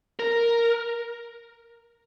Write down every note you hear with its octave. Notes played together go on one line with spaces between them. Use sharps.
A#4